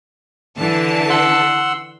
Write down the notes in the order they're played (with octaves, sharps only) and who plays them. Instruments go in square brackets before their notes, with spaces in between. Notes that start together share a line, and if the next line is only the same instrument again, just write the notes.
[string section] D3 E3 A5
[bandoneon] F#5 C6 E6